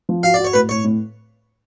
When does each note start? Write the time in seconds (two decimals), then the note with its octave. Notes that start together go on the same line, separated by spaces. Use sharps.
0.09 F3
0.23 F#4 F5
0.34 F#4 D5
0.44 C#5
0.53 A2 B4
0.69 A2 C#5
0.84 A2